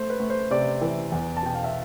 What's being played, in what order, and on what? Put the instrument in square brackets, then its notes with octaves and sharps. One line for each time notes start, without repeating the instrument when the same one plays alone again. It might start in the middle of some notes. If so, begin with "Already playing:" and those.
Already playing: [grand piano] A3 C5
B4
A3
C5
C3 D5
E3
E2
A5
B2 G5
F5
E5